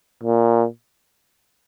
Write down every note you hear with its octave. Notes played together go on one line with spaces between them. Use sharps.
A#2